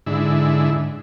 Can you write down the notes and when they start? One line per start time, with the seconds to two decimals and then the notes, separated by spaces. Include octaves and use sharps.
0.06 G#2 D3 E4